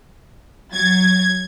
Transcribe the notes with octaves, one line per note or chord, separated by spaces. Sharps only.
F#3 G#6 A6